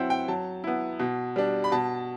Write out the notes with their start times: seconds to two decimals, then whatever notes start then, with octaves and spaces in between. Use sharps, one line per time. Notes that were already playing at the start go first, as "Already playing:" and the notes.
Already playing: F#3 C4 E4 F#5 G5
0.10 G5
0.28 F#3 A5
0.64 B3 E4
1.00 B2
1.36 G3 D4
1.64 B5
1.72 B2 A5